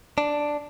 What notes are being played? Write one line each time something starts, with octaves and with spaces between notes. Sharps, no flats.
D4